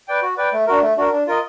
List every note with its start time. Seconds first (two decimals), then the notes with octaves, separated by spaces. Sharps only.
0.08 B4 D5 G5
0.22 F#4
0.37 B4 D5 G5
0.53 A3
0.67 D4 F#4 A#4
0.82 A3
0.97 D4 F#4 A#4
1.12 D4
1.27 F4 A#4 D#5